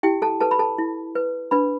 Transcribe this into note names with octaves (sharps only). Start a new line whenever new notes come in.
E4 G4 G5
A4 A5
A4 B4 A5
B5
A4 A5
E4
B4
D4 B4 B5